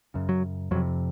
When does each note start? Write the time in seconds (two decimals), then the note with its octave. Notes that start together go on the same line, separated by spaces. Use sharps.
0.14 F#2 C#3
0.29 F#3
0.71 F2 F#3
0.75 C3